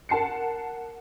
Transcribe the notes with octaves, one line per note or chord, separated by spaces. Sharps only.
A#4 F#5 A5 C7 C#7